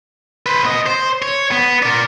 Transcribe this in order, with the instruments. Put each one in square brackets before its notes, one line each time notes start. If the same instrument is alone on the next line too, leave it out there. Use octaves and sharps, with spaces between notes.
[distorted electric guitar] B4 C5
B3 D#5
C5
C#5
B3
A#4 D5